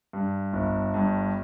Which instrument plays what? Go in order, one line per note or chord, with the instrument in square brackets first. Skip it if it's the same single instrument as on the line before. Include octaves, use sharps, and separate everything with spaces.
[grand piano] G2
G1
G2